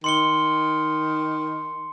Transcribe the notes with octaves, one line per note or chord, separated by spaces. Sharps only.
D#3 C6 C#7 G7